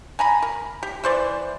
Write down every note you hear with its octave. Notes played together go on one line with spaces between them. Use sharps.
G#5 A#5 B5
A#4
G4
E3 C5 D5